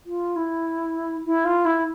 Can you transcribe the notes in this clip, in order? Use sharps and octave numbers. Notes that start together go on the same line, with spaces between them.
F4
E4
E4
F4
E4